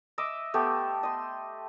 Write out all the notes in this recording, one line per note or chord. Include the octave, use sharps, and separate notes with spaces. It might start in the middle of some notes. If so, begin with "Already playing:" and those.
D#5 E5 D6
A3 B3 G4 A4
D#5 C6